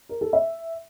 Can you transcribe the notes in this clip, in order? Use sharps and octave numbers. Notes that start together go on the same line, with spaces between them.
A#4
A4
E5